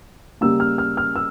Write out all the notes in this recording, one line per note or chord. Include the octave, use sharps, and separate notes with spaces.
C#3 G3 A#3 E6
F6
F6
F6
E6